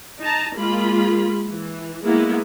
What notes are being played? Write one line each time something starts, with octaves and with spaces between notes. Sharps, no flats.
D#4 A5 A#5
G#3 A#3 F4 B5
E3
G#3 A#3 B3 E4